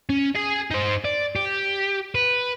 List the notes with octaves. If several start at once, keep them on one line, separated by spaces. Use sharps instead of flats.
C#4
G#4 G#5
D#4 C5
D5
G4
B4